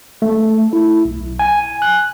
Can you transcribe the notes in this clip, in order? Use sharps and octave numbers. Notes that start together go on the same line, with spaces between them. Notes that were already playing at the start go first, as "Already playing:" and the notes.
A3
E4
B1
G#5
F#6